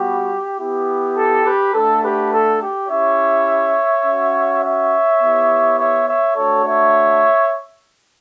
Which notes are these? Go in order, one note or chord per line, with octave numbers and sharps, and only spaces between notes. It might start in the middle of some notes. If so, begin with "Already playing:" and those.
Already playing: G3 B3 F#4 G4
B3 E4 G4
A4
G4 B4
A3 D4 F#4 A4
G4 B4
A4
G4
C#4 E4 G4 C#5 E5
C#4 F#4
C#5 E5
B3 E4 G4
C#5 E5
C#5 E5
A3 D4 F#4 A4 C#5
C#5 E5